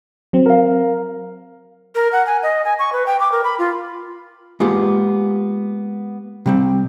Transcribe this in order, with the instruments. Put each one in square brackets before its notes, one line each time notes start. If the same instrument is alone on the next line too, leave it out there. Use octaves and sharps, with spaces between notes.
[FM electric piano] F#3 C4
[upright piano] A#4 F5
[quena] A#4
F#5
G#5
D#5
G#5
C#6
B4
G5
D6
A#4
B5
F4
[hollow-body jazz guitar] G#3 A#3 B3 F4 G4
C3 G3 C4